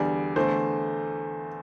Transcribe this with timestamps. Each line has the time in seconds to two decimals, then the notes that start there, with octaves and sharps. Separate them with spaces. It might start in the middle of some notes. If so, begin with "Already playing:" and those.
Already playing: E2 D3 G3 D5
0.36 E2 D3 A3 C5